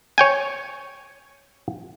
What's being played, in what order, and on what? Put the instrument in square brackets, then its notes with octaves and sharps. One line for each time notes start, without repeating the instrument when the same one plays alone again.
[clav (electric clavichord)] C#5 G5 G#5